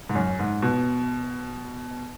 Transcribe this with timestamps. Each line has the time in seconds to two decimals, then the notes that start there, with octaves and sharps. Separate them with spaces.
0.09 G#2
0.15 F#2
0.39 G#2
0.62 B2